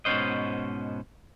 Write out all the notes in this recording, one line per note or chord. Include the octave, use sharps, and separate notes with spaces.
G#2 B2 F#3 C#4 C5 D#5